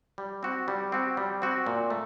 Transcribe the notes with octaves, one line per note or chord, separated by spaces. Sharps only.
G3
C4 F#4
G3
C4 F#4
G3
C4 F#4
A#2
A3